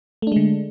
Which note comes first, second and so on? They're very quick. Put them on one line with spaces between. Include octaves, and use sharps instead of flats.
A3 D4 G#3 D3